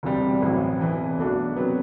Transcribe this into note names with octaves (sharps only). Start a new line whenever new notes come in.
E1 D2 C3 G3
A1 A2 F#3 C4
E1 E2 C3 E3
B1 B2 A3 D4 F#4
C3 F#3 B3